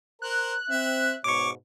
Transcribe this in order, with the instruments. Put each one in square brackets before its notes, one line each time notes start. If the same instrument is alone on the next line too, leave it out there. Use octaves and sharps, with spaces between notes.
[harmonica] A#4 C5 [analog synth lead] F#6
[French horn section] C4 [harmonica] E5
[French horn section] G#2 B2 [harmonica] C#5 [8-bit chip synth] C#6 D6